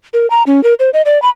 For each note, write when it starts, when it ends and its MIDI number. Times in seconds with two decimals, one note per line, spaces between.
0.14 0.29 70
0.30 0.43 82
0.47 0.63 61
0.64 0.74 70
0.80 0.90 72
0.93 1.02 75
1.05 1.21 74
1.22 1.30 83